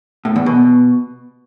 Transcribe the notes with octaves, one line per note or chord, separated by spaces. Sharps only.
A2
E2
B2